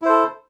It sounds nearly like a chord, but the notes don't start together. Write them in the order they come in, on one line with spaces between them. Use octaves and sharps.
E4 C5 A4